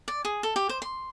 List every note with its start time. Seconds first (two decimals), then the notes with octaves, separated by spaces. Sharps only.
0.08 D5
0.25 G#4
0.43 A4
0.56 G4
0.69 C5
0.82 C6